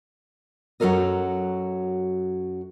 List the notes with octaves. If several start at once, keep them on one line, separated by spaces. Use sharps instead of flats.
F#2 F#3 F4 A4 A#4 D#5